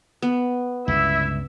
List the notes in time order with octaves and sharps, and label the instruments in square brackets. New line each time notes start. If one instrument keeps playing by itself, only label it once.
[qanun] B3
[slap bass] C#2 G2 D3 [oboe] E4 [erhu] E5